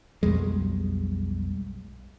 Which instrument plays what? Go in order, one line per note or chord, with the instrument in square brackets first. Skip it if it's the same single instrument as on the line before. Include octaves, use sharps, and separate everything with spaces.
[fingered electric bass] B1 F2 G3 G#3